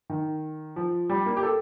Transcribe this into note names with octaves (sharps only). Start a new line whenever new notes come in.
D#3
F3
G3
A#3
G4
A4